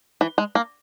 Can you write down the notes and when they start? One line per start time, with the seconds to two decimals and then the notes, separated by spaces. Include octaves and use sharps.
0.21 E3
0.38 G#3
0.55 A#3